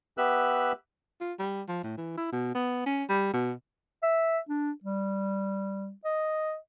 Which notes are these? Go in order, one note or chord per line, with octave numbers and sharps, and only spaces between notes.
B3 G4 B4 E5 E6 F#6
F4
G3
F3
A2
E3
E4
B2
B3
C#4
G3
B2
E5
D4
G3
D#5